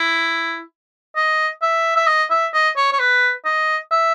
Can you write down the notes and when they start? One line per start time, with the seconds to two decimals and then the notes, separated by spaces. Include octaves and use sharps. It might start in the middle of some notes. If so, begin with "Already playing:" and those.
Already playing: E4
1.16 D#5
1.62 E5
1.96 E5
2.08 D#5
2.31 E5
2.54 D#5
2.77 C#5
2.93 C#5
2.99 B4
3.45 D#5
3.91 E5